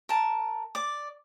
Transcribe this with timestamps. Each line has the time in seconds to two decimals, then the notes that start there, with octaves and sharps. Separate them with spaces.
0.09 A#4 A5
0.75 D5 D6